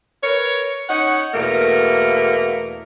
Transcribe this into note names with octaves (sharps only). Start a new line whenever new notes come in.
A#4 B4 C#5
C#4 D#4 C#5 F#5
E2 B2 A3 A#3 A#4